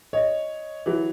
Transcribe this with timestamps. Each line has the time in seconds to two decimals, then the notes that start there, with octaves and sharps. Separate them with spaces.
0.13 C#5 D#5
0.86 E3 F#3